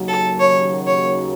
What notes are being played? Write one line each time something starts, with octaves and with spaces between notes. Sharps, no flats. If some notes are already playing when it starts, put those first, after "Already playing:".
Already playing: D#2 C#3 F#3
A4
C#5
C#5